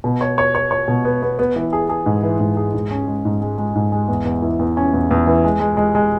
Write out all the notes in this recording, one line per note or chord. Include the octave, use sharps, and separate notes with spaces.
B2
C#5
C#5
C#5
C#5
B2
B3
B3
B3
E3
G#4
G#4
G#2
E3
G#2
G#4
G#2
C#4
G#3
G#2
G#3
G#3
G#2
G#3
E2
E2
E3
E2
C#4
E2
E2
E3
G#3
G#3
G#3
G#3